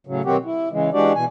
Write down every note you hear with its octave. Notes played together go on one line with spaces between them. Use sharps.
A2 C#3 F#3
B2 D#3 F#3 C4 F#4 G4
E4
C#3 E3 G#3
E3 G#3 D4 F#4 G4 D5
B2 E3 G#5